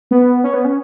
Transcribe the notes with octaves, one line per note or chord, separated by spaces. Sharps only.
B3
C#4
B3
C#4